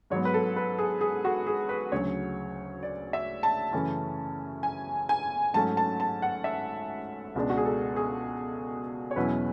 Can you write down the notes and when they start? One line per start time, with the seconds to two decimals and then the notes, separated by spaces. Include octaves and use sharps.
0.10 G#2 F#3 B3 C#5
0.25 B4
0.34 A4
0.56 B4
0.78 G#4
1.01 G#4
1.25 F#4
1.47 G#4
1.69 B4
1.92 D2 C#3 F#3 C#5
2.83 D5
3.13 E5
3.43 A5
3.73 F#2 C#3 E3 A3 C#4
4.63 G#5
5.09 G#5
5.54 G#2 F#3 A3 C#4 A5
5.77 A5
6.00 A5
6.22 F#5
6.44 E5
7.36 C#2 B2 G#3 D4
7.50 F#4
7.57 G#4
7.65 A4
7.96 G#4
9.11 C#5
9.16 E2 B2 F#3 C#4 E4 B4